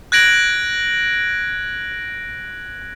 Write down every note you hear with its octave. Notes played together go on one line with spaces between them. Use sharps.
F#6 G#6 A#6 D7 F#7